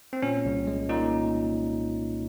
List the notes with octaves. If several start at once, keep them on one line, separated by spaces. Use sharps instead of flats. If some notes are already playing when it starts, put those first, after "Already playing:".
C4
A#2 C#4
C2
G#3
A#2 D#4